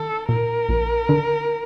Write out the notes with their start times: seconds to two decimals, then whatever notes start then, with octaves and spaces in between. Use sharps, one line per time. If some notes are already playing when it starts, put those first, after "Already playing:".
Already playing: D#3 A4
0.29 A#2 A#4
0.69 A#1
1.09 D3